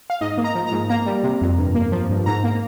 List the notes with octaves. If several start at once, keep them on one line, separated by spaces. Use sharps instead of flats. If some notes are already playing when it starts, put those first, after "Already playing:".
F5
G#2 D#5
A#3
A#5
F3
A#5
G#2
A#3 A#5
G3
C3
F2
G2
A#3
F3
G2
G#2 A#5
A#3